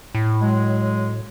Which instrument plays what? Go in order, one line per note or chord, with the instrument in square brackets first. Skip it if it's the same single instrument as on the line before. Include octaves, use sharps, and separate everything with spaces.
[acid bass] A2
[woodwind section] F#3 G#3